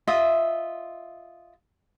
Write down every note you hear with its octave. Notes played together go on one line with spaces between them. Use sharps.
F4 D#5 E5